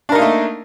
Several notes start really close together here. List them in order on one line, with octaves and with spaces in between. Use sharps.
D4 A#4 D#4 A#3 A3